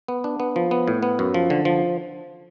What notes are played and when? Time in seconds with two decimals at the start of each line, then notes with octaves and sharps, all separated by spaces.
0.08 B3
0.24 D4
0.40 B3
0.56 F3
0.71 B3
0.88 A2
1.03 B3
1.19 F#2
1.34 F3
1.50 D3
1.65 F3